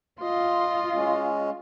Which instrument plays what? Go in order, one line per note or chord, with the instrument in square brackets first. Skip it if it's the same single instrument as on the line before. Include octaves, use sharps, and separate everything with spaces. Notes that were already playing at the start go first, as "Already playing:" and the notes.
[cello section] F4 [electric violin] D#5 C6
[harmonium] G#3 C#4